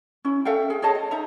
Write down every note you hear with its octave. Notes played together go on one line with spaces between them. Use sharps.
C#4 E4
A4 E5 F5 G5
G#4
G#4 C#5 D#5 A5
D#5
D#4 E5 A#5